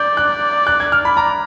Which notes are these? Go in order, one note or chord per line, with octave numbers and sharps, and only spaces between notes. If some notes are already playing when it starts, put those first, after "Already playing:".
Already playing: D5 G6
F#6
F#6
G#6
F6
B5
A#5